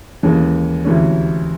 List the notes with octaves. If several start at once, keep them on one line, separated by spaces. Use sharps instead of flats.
D#2 C#3 E3 G#3
D2 C3 E3 G#3 C#4